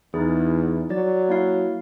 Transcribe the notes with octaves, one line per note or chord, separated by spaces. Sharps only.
E2 D#4 E4 G#4
F#3 D5 A6
A#3 E4 F5